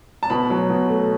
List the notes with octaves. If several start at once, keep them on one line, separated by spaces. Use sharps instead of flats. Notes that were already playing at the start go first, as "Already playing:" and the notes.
A5
B2 B5
F#3
B2
A3